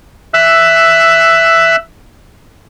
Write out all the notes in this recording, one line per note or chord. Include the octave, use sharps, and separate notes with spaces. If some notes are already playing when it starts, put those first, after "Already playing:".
E5 E6 F#6